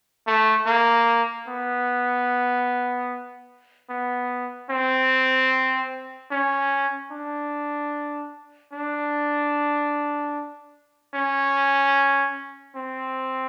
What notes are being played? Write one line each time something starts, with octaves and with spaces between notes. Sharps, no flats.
A3
A#3
B3
B3
C4
C#4
D4
D4
C#4
C4